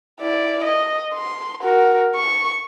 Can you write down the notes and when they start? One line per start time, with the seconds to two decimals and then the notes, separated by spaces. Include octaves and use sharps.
0.21 E4 D5
0.64 D#5
1.14 C6
1.63 F#4 A#4
2.15 C#6